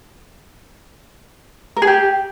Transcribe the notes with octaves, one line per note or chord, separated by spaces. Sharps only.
A#4
G#4
G4